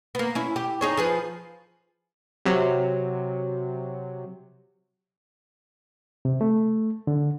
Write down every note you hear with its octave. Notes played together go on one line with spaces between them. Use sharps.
A#3 B3
C#4 E4
G4
D#4 G#4 C#5
F3 G#4 B4
C3 F#3
C3
A3
D3